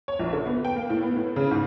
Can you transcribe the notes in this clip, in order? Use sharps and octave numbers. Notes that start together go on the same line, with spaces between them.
C#5
A#1
D3
B3
G5
A#3
A2
B3
A2
C#3
G#2